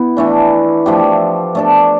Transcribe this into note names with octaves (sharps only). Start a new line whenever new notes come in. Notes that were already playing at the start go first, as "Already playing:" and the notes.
Already playing: B3 E4
E3 A3 D4
F3 A3 D4 G4
A3 D4 A4